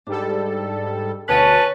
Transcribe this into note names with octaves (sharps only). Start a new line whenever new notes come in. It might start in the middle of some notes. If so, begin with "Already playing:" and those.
G#2 G3 D4 A4
D2 B2 C#4 B4 C#5 A5